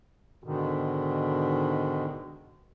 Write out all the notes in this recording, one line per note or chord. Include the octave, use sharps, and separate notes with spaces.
G#2 B2 D3 D#3